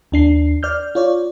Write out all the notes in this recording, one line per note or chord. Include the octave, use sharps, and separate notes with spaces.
D#2 D4 C7
D5 F6 G6
F4 C#5 D5